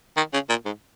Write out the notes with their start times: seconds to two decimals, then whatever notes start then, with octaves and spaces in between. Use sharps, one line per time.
0.17 D#3
0.33 C#3
0.49 A#2
0.66 G#2